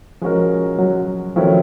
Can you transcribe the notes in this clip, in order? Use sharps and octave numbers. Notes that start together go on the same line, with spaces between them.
F3 G#3 C#4 F#4 A#4
F#3
D#3 F3 F#3 A3 C#4 E4